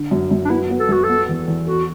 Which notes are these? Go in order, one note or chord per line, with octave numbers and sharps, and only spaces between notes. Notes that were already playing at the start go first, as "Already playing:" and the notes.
Already playing: D3
F#2
F#2
D4
B3 E4
B3
A4
F#2 F#4
A4
B3
E2
E2
F#4 A4